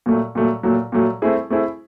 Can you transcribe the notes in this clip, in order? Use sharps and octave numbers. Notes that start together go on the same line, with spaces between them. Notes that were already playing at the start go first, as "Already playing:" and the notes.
A#2 F#3 A3
A#2 F#3 A3
A#2 F#3 A3
A#2 F#3 A3
A3 C4 E4 G#4
A3 C4 E4 G#4